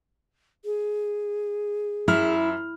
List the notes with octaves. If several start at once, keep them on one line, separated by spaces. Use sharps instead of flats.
G#4
F#2 E4 E5 F6